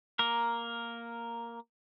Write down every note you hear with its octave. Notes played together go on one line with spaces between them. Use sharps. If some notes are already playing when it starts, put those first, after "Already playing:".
A#3 A#4